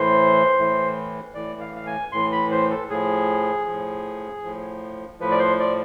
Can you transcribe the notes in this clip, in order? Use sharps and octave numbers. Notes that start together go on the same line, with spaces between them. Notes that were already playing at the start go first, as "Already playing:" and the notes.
Already playing: A2 E3 C5
A2 E3
A2 E3 D5
F5
F5
G#5
A2 E3 C6
B5
C5
A4
A2 F3 G#4
A2 F3
A2 F3
A2 F3 B4
D5
C5
D5